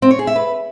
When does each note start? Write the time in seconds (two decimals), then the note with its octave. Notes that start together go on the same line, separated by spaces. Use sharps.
0.02 C4
0.11 C#5
0.19 G#4
0.27 E5
0.36 B4